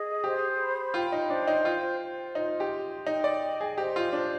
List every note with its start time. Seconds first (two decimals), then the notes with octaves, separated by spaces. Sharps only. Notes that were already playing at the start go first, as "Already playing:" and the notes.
Already playing: G#4 D#5
0.23 G4 C5
0.58 B5
0.94 F4 G5
1.12 D#4
1.29 D4 C5
1.48 D#4
1.65 F4 G5
2.00 C5
2.35 D#4 F4
2.60 G4
2.71 C6
3.06 D#4 G5
3.24 D5
3.42 D#5
3.61 G#4
3.78 G4 C5
3.96 F4
4.13 D4 C5